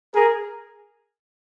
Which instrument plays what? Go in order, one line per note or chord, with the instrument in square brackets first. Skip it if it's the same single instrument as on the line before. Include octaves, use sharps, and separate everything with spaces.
[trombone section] G#4 A#4